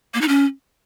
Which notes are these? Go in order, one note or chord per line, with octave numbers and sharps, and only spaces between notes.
A#3
D#4
C#4